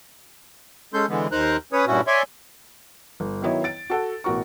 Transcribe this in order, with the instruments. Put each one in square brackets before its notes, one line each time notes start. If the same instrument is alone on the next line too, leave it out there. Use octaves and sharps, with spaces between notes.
[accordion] G#3 C#4 A4 C6 G6
D3 E3 G#3 B3
D#2 D#4 A#4 C5 A#5 F#6
C#4 B4 C#5 D#6
G2 A#2 C#4 E4 F#4
C#5 D5 E5 G#5 C6 C#6
[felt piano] G1
D#3 F#3 B3 E4 C#5 D#5
A6 D7
F#4 A4 F#5
A1 B2 F#4 A#4 C#6